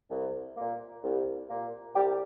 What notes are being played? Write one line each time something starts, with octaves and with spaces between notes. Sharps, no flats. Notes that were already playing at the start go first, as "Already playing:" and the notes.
C2
A#2 A#3
C2
A#2 A#3
C2 G3 G4